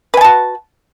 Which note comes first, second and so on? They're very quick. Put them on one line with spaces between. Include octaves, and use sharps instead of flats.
B4 G#5 A5 F#4